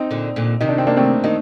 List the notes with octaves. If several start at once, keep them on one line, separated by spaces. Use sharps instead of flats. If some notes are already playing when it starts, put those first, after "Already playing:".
Already playing: C4 D#4
A#2 D3
A#2 D3
C3 D#3 D#4
D4
C4
A#3 D4
A3 C4
D#3 D#4